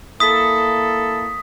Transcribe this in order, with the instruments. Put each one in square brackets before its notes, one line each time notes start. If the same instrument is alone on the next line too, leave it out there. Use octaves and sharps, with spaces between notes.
[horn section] A#3 E4 A4 [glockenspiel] D#6 B6